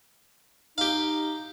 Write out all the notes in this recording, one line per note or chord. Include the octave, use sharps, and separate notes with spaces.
D#4 G4 F5